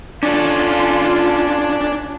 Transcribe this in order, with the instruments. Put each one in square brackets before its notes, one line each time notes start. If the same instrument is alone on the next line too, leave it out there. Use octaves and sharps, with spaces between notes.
[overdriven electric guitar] C#4 A4 [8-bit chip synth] D4 [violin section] F4